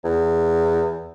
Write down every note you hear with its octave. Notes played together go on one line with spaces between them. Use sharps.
E2